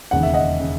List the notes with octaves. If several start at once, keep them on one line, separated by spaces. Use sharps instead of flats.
E1 D#2 C#3 F#5
E5
D#5 F#5
C#3